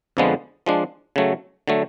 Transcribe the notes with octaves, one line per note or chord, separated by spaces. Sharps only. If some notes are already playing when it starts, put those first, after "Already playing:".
F2 D3 F3 G#3 B3
F3 G#3 D4
C#3 F#3 A3
D3 F#3 A3